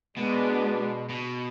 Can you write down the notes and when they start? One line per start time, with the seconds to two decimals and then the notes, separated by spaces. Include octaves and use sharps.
0.17 B2 G#3 B3 D4
1.09 B2